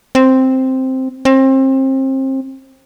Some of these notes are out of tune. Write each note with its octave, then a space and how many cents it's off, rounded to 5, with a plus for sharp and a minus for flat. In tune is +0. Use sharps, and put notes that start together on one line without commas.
C4 +0
C4 +30